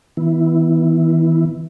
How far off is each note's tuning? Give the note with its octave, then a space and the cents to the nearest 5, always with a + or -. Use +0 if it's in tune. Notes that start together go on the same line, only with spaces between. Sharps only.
E3 -35 B3 +5 E4 +0